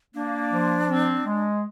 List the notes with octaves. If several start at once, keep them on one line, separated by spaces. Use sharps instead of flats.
A#3 D4
F3
C4
G#3